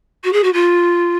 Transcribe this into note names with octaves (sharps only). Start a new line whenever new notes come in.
F#4
G#4
F#4
F4